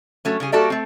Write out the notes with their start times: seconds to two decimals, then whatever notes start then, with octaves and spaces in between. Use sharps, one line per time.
0.25 F#3 A3 C#4
0.40 C#3 G3 G#4
0.52 G3 A#3 F#4 A4 D5 E5
0.70 A3 C4